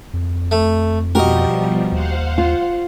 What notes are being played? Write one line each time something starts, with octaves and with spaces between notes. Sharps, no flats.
F2
A3
B2 F3 G3 F#4 G4 A#4 D#5
D#2 C5 F5 F#5
F4